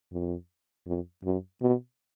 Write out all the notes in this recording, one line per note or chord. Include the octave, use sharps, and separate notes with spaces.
F2
F2
F#2
B2